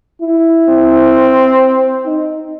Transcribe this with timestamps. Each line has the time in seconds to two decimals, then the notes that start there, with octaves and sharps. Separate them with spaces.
0.22 E4
0.69 C4
2.06 D#4